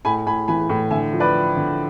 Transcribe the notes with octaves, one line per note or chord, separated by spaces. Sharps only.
A2 G#5 B5
A2 G#5 B5
E3 G#5 B5
A2
D3 E5 G#5
F3
B4 D5
F3
D3